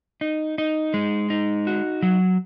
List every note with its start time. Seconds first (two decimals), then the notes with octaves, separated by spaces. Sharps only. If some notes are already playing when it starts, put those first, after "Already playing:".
0.21 D#4
0.58 D#4
0.94 G#3
1.30 D#4
1.67 F#4
2.03 F#3